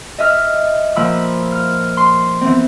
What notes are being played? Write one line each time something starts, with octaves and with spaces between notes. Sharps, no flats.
D#5 E5 F6
A#2 F3 B5 E6
F6
C6
E3 B3 C4